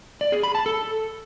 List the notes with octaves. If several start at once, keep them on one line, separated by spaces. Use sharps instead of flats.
D5
G#4
B5
A5
A4